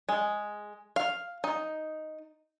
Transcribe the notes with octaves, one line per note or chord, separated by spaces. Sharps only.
G#3
F5
D#4